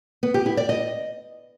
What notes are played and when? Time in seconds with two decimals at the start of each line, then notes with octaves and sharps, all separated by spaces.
0.23 B3
0.34 G4
0.46 E4
0.57 D5
0.69 D#5